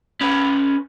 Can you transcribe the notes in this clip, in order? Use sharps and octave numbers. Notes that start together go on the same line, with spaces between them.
C#4 B4